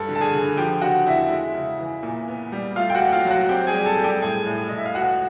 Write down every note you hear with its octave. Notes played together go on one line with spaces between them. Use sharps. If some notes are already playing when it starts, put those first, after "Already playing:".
Already playing: G2 A4 A5
D3
A5
G#4 G#5
D3
F3 G4 G5
C#3 F#4 F#5
E2 E4 E5
G#3
C#3
E3
A#2
B3
G3
A3 F4 F5
G5
F#4 F#5
D#2
F4 F5
F#3
F#4 F#5
C4 G4 G5
G#4 G#5
G3
A4 A5
G3
G4 G5
A2 G#4 G#5
A2
A2 D#5
E5
F5
C#2 F#4 F#5